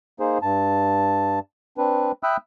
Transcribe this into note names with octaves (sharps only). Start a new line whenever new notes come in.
A#3 D#4 G#4 C5
G2 A5
C4 D4 B4
E5 G5 B5 D#6 E6 F#6